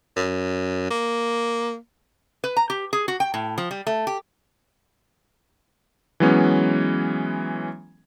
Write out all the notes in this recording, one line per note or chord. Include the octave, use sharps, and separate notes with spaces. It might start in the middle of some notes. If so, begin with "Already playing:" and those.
F#2
A#3
B4
A#5
G4
G#4
F#4
G5
A2
F3
G3
A3
G4
E3 F#3 G#3 B3 C#4